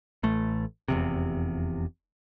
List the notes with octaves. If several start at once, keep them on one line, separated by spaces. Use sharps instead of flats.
A1 A3
F1 E2 C3